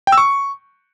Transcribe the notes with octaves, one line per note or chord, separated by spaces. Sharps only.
G5
E6
C#6